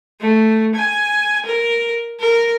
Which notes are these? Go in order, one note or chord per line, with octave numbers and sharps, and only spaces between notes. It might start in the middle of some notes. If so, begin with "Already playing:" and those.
A3
G#5
A#4
A#4